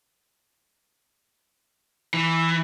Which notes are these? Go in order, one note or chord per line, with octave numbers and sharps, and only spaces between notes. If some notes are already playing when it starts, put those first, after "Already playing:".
E3